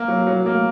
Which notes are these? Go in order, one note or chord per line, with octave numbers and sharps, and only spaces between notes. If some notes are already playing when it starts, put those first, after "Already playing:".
Already playing: A#3
F#3
F#3
A#3